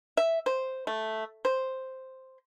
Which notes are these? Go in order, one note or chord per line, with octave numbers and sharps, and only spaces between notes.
E5
C5
A3
C5